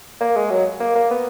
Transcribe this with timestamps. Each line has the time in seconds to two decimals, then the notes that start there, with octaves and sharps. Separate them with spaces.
0.21 A#3
0.36 G#3
0.50 F#3
0.80 A#3
0.95 A#3
1.11 B3